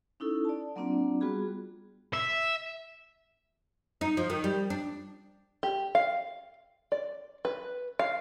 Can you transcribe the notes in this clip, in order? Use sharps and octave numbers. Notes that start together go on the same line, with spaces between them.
C#4 D#4 E4 A4
D5 A5
F#3 A#3 C4 D4 F4 D5
G3 B3 F4 F#4 G#4 B5
E5
D#4
F3
D#3
G3
D4
G4
F5
D5
B4
F5